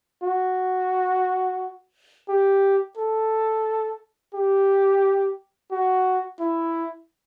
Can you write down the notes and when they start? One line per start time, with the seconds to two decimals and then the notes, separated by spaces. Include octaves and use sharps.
0.23 F#4
2.29 G4
2.97 A4
4.34 G4
5.71 F#4
6.40 E4